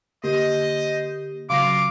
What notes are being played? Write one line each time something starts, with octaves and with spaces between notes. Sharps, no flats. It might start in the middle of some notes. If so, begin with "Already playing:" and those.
D3 A#3 G4 C5 D#5
C#3 F#3 F4 F5 C6 D6 A#6